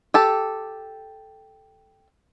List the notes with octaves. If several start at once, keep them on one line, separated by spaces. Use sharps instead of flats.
G4 A4